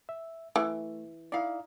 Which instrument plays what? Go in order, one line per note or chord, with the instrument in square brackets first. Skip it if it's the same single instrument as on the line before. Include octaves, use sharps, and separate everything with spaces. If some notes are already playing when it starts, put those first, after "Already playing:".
[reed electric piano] E5
[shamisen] E3 [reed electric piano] A3
[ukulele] D#4 F5 [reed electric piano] E4 D5